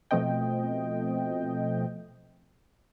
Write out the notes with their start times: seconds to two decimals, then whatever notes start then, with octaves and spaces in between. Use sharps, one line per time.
0.11 B2 F3 A3 C4 D#5 G5